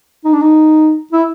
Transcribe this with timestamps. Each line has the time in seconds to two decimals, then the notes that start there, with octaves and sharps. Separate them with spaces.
0.25 D#4
0.33 D4
0.41 D#4
1.13 E4